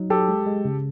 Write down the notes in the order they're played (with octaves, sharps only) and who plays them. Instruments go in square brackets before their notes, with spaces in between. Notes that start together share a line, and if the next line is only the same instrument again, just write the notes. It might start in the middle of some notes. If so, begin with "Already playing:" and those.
Already playing: [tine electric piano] F#3 D#4
[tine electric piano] F#3 [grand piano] G4 A4
[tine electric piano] G#3
G#3
C#3